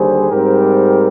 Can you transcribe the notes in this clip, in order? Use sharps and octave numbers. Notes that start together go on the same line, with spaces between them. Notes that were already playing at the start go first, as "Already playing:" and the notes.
Already playing: D#2 D3 G3 G#4 C5
G#2 G3 C4 G4 A#4